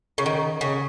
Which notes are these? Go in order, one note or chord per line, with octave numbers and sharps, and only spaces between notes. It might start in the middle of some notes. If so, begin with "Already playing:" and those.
C#3
D#3
C#3